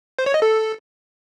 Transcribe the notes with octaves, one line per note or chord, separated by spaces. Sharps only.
C5
C#5
D#5
A4